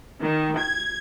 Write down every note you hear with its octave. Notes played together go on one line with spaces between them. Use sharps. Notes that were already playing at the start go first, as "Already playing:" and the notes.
D#3
G#6